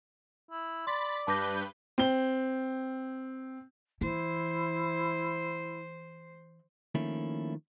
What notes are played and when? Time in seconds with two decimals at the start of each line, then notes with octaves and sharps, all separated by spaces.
0.51 E4
0.87 D5 B5 C6 A6
1.27 G2 B4 A5 D6 G6 A#6
1.98 C4 G7
4.01 E3 E4 C5
6.95 D#3 F3 A3 A#3 C#4 E4